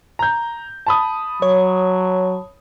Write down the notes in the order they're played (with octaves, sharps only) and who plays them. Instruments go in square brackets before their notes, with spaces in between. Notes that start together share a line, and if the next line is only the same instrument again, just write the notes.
[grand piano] A#5 G6
A5 B5 D#6
[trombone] F#3 [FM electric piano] C#5